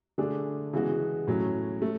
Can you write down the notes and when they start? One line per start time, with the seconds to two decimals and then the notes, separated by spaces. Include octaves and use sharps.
0.18 D3 A3 D4 G#4
0.73 C#3 E3 G#3 B3 F#4
1.27 A2 F#3 C#4
1.82 A3